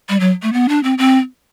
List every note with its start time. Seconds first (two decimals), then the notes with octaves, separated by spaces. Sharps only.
0.09 G3
0.20 F#3
0.43 A3
0.53 B3
0.69 D4
0.84 C4
0.98 C4